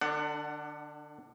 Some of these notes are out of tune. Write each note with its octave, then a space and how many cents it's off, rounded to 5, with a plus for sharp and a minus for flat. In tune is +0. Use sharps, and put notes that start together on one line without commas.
D3 +35 D4 +0 F#5 +10